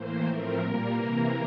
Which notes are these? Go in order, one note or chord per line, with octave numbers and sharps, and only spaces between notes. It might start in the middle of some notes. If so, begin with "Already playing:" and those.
Already playing: A2 E3 A#3 C5
A2 F3 A3 C4 A#4
A#2 G3 A#3 A#4
C3 E3 A#3